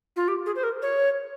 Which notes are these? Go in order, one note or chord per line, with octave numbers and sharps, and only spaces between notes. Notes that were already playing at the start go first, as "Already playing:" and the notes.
F4
G4
G#4
C5
A#4
C#5